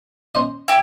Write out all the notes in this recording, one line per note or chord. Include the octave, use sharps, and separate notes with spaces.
C#4 C5 D#5
E4 G4